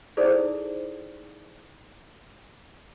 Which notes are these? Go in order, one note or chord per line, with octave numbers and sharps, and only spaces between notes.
D#4 E4 G#4 A4 C5 D5